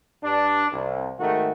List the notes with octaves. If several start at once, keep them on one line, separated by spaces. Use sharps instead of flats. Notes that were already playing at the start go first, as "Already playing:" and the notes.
G2 D4
C2
G#2 D#3 A3 F#4